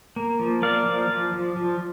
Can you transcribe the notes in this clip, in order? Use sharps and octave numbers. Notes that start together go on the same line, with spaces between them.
A#3
F3
A#3 D5 F5
F3
F3
F3
F3